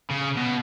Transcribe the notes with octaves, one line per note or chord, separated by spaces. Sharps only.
C#3
B2